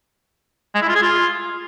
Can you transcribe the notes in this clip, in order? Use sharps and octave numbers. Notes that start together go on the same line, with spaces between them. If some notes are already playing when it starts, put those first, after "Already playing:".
G#3
E4
F4
G#4
F4